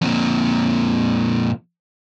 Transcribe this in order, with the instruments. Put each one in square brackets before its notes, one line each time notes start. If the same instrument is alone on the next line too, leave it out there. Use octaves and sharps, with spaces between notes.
[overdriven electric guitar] F2 A#2